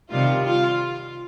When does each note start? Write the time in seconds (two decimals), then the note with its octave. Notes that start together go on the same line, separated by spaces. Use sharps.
0.11 C3 D#3 G3 F4
0.43 F4